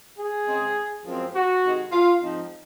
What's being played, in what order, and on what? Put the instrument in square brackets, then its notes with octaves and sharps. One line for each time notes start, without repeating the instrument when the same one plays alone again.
[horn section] G#4
C#3 G#3 C4
F#2 F3 G#3 C4
F#4
C3 D#3 G#3
F4
G#2 F3 C4 D#4